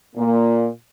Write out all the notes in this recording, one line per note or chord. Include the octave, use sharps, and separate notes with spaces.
A#2 A#3